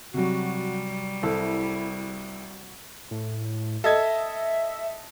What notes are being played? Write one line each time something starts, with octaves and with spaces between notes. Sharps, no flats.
C3 F#3 G3 F#4
C2 E4 A4
A2
A4 D#5 E5 G#6